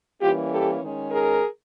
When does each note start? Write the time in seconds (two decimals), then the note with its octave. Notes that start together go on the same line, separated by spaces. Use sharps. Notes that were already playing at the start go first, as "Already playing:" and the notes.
0.21 E3 G3 A#3 C#4 F4 G4
0.51 G4 A4
0.81 D#3 G#3 C#4
1.11 G#4 A#4